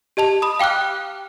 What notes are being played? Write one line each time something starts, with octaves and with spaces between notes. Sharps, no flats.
G4 D#5 A5 F7
B5 D#6
F5 G5 D6 F6 F#6